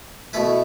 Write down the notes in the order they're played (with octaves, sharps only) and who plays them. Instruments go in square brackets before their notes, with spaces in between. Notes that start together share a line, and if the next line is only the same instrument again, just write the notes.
[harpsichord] B2 A3 E4 B4